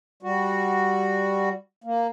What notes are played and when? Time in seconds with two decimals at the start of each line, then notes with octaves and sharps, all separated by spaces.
0.23 G3 F#4
1.84 A#3